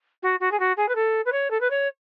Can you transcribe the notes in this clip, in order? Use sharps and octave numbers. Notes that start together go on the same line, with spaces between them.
F#4
F#4
G#4
F#4
G#4
B4
A4
B4
C#5
A4
B4
C#5